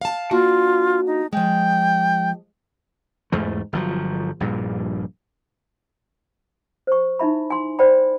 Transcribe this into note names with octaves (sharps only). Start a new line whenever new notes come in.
F5 A5
A#3 D4 F4 F#4
D#4
F3 G#3 G5
E2 G#2 A3
G1 F3 F#3
A#1 G2 A#2
C5 C#6
D#4 E4 E5 B5
G#5 C6
C5 D5 G5 B5